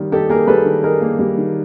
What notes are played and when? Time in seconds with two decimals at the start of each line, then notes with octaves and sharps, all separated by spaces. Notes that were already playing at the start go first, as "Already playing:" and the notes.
Already playing: D#3 G3 A#3 D#4
0.12 D#4 G4 A4
0.29 A#3 G#4 A#4
0.47 G3 A4 B4
0.65 D#3
0.83 D#4 G#4 A#4
1.01 A#3
1.19 G3
1.37 D#3